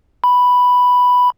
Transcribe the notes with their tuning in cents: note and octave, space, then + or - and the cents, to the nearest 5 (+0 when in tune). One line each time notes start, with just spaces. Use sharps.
B5 +0